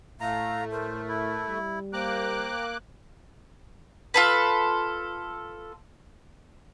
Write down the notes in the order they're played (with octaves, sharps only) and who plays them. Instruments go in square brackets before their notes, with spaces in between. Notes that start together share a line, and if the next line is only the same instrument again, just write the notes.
[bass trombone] A2 [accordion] A3 [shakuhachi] F5 [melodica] A#5
[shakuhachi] A#4 [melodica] C5
[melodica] E4
[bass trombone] G3
[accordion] A#3 D6 F#6 [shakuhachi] C5 [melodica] G5 A#5
[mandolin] F4 A4 B4